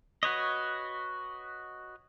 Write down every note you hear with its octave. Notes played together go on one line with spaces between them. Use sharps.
F#4 B4 C#5 D#5